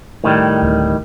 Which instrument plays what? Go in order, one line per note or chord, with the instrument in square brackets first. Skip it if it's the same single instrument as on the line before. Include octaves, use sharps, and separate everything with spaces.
[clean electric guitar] A2 D#3 G3
[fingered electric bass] D1 D2